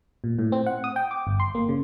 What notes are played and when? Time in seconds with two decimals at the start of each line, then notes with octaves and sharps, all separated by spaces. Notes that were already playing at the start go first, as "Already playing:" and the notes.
0.24 A#2
0.39 A2
0.52 C4
0.66 F#5
0.84 D#6
0.96 G5
1.11 D6
1.27 G1
1.40 C6
1.55 A#3
1.69 C#3